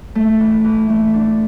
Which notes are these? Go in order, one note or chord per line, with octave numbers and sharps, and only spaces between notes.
A3
E3
E3
A3
D4